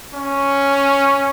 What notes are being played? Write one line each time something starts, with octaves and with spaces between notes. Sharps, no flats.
C#4